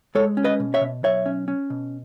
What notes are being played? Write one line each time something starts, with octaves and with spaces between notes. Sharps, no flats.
G#3 A4 C#5
C#4
B4 D#5
B2
C#5 E5
B2
B1 C#5 E5
C#4
C#4
B2